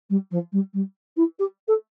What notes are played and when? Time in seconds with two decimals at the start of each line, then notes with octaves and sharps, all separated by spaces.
0.10 G3
0.31 F3
0.52 G3
0.73 G3
1.17 E4
1.39 G4
1.68 A4